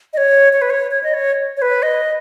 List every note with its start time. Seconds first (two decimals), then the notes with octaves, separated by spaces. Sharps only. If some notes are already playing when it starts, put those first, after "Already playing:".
0.13 D#5
0.17 C#5
0.53 C#5
0.62 B4
0.70 C#5
0.91 C#5
1.03 D#5
1.14 C#5
1.57 C#5
1.62 B4
1.83 D#5